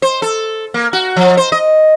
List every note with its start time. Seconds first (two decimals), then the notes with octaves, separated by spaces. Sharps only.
0.02 C5
0.22 A4
0.74 A#3
0.93 F#4
1.16 F3
1.37 C5
1.52 D#5